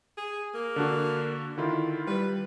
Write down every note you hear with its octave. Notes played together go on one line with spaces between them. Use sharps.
G#4
A#3
D3 D4 F#4
D3 D#3 E4 F4
G3 B4